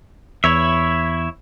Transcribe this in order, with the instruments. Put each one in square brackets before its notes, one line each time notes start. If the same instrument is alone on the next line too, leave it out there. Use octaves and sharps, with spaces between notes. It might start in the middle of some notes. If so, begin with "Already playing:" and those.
[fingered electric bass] E2 [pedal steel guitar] E4 C#5 E5